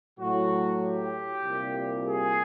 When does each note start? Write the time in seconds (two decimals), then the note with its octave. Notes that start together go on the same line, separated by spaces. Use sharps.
0.20 A2 F#3 F#4
0.82 G4
1.44 C2 A#2 G3
2.06 G#4